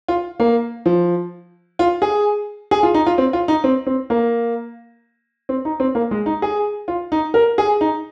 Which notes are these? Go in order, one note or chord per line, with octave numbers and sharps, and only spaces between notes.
F4
A#3
F3
F4
G#4
G#4
F4
D#4
F4
C4
F4
D#4
C4
C4
A#3
C4
D#4
C4
A#3
G#3
D#4
G#4
F4
D#4
A#4
G#4
D#4